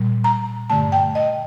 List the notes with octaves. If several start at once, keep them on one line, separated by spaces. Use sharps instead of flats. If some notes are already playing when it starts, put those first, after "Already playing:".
Already playing: A#2 G3
A#5
G2 D3 A3 A5
G5
D#5